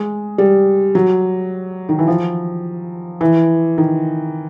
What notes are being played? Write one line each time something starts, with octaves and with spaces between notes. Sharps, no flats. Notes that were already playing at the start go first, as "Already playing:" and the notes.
Already playing: G#3
G3
F#3
D#3
E3
F3
E3
D#3